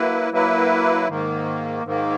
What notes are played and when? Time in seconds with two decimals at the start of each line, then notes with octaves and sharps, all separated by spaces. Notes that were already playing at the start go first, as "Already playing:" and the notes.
Already playing: F#3 A#3 E4 B4
0.31 F#3 A#3 E4 B4
1.08 G#2 D#3 A#3
1.84 G#2 D#3 A#3